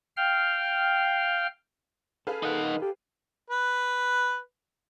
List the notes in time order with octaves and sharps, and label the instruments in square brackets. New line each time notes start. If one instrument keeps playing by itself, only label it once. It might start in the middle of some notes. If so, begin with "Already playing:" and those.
[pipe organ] F5 G5 F6
[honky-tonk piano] G#4 B4 F5 [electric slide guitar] A4
[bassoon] D#3 [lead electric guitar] D#4 F#5
[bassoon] G4 [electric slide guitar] A4
[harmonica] B4